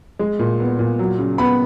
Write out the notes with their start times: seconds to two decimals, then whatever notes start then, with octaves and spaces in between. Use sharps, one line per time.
0.19 G#3
0.39 A#2
0.60 B3
0.79 A#2
0.99 F#3
1.19 C#3
1.38 B3 B5